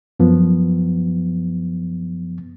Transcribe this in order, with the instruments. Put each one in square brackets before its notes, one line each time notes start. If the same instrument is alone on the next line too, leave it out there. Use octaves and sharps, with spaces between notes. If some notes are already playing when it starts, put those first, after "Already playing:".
[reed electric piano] F#2 F3 B3